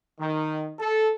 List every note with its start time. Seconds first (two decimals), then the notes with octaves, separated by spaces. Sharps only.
0.19 D#3
0.79 A4